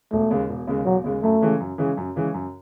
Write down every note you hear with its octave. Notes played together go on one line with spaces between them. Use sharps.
E1 A3
D#2 C#3 G#3
E1
D#2 C#3 G#3
E1 F#3
D#2 C#3 G#3
F#2 A3
C#3 E3 G#3 C#4
F#2
C#3 E3 G#3 C#4
F#2
C#3 E3 G#3 C#4
F#2